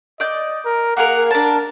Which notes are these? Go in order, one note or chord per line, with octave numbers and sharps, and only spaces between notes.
D5 D#5 G6
A#4
A#3 G#4 A#4 F#5
D4 A#4 A5